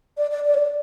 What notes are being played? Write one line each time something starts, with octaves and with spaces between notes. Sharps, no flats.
D5
D5
D5
C#5
D5